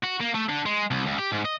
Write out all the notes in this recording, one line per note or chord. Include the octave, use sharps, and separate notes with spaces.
F#4
A#3
A3
D3
G#3
C2
C#2
G4
G#2
D#5